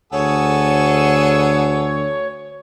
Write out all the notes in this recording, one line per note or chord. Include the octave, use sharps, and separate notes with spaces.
D2 B3 G#4 A4 C#5